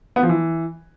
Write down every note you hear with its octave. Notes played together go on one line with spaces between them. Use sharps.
B3
F3
E3